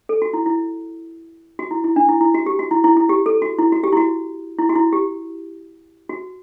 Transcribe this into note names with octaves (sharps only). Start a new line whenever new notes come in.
A4
F#4
E4
E4
F#4
E4
E4
D4
E4
E4
F#4
G4
F#4
E4
E4
E4
G4
A4
F#4
E4
F#4
G4
E4
F#4
E4
F#4
E4
G4
F#4